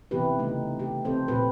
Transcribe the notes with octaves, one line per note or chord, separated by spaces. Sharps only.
C3 E3 B3 E4 G4 B4
C#3 A3 D#4
A3 G4
F3 C4 A4 C5
A#2 G4 B4